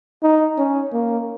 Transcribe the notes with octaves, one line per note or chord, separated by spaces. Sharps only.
D#4
C#4
A#3